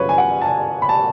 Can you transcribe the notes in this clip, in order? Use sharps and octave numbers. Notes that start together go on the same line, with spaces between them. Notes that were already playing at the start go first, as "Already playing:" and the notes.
Already playing: F#2 C#3 F3 B4 C#5
G#5
F#5
A5
G#5
B5
A5